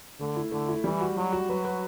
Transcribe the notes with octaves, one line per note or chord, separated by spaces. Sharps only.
D3 A3
E4
D3 A3
E4
E3 G3
F#4
F#3 F#4
F#4
F#3 B4
B4